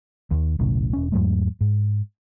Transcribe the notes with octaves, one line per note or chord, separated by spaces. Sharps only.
D#2 D#3
E1 B1 A2 C#3
E1 C#4
E2 G#2 F#3 A3
G#2